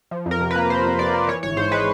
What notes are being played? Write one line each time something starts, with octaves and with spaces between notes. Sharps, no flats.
F3
F2
A#4
C3
B4
A#3
F3 C5
F2
C3 D5
A#3
E3 C#5
G#1 C#5
G#2 C5
G#3 B4